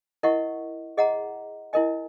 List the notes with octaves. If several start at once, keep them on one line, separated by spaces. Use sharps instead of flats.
E4 A#4 D#5 F#5 C#6
G#4 D#5 F#5 A#5
E4 A#4 D#5 G#5